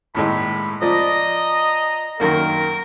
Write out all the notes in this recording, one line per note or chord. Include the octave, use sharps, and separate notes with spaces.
D#2 A2 G#3 B5
F3 D5 D#5 A#5 D#6
F#2 D#3 A#3 A#4